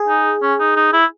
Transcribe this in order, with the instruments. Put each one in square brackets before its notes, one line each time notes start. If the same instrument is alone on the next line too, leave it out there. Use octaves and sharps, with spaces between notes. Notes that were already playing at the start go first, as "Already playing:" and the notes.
Already playing: [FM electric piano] G#4
[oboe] D#4
C#4
D#4
D#4
E4